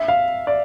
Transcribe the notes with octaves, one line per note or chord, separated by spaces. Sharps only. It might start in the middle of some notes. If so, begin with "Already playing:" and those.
Already playing: E5
F5
D5